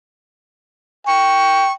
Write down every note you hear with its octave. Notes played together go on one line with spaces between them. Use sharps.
G5 C#6